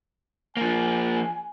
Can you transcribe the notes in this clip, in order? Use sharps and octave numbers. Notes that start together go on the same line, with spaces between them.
F3 A#3 G#5